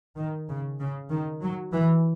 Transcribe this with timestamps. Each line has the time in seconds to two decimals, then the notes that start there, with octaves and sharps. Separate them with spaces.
0.17 D#3
0.48 C#3
0.80 C#3
1.11 D#3
1.42 F#3
1.73 E3